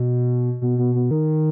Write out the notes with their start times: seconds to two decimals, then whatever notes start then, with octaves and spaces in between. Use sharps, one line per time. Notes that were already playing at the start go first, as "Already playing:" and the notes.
Already playing: B2
0.62 B2
0.78 B2
0.95 B2
1.11 D#3